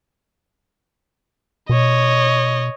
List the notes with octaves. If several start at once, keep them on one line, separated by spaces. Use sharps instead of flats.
B2 C#5 D#5